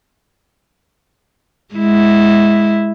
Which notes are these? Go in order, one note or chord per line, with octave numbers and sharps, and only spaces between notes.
G#3 E4